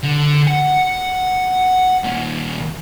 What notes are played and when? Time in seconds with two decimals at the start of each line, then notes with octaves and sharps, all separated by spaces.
0.03 D3
0.47 F#5
2.04 A#2 D#3